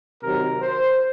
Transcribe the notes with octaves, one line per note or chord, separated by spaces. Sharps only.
C3 D#3 F#3 A#4
C5